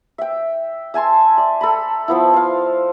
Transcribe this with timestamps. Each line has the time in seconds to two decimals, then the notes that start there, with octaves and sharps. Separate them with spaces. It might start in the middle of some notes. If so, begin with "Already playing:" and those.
0.18 E5 G5
0.94 E5 G#5 A5 C6
1.38 D5
1.61 A4 A#5 B5
2.08 F3 B3 E4
2.34 C5 F5